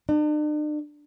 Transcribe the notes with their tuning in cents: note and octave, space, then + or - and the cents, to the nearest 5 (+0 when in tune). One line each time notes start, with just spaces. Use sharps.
D4 +45